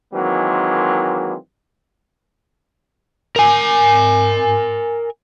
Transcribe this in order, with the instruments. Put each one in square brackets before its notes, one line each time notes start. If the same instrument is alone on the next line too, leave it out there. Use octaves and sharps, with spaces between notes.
[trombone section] D#3 E3 F#3 G#3 A#3 C4
[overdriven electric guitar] A#4 G#5